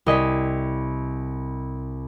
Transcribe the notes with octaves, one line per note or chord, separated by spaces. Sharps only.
C2 D#5 G#5 B6